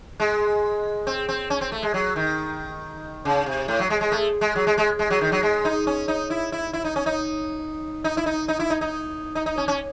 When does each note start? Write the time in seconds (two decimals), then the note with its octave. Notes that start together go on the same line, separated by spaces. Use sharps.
0.20 G#3
1.07 C4
1.28 C4
1.50 C#4
1.61 C4
1.72 A3
1.83 G#3
1.94 F#3
2.16 D#3
3.25 C#3
3.46 C3
3.68 A2
3.79 F#3
3.90 G#3
4.01 G#3
4.12 A3
4.41 G#3
4.56 F#3
4.67 G#3
4.78 G#3
4.99 G#3
5.10 F#3
5.21 D#3
5.32 F#3
5.43 G#3
5.65 D#4
5.87 C#4
6.08 D#4
6.30 E4
6.52 E4
6.73 E4
6.84 D#4
6.96 C#4
7.06 D#4
8.04 D#4
8.17 E4
8.26 D#4
8.48 D#4
8.59 E4
8.70 D#4
8.81 D#4
9.35 D#4
9.46 D#4
9.58 C#4
9.68 C#4